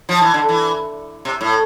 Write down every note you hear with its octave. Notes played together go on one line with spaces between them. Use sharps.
F3
E3
D3
E3
C3
A2